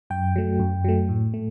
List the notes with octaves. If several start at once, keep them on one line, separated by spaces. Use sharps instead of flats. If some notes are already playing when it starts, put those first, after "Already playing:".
F#2 G5
F#3 A3
F#2
F#3 A3
A2
A3